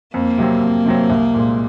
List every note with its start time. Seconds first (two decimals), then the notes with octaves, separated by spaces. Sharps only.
0.14 F2 A#3
0.38 C3 F#3 C4
0.62 F2
0.85 C3 F#3 C4
1.10 C2
1.34 A#2 G#3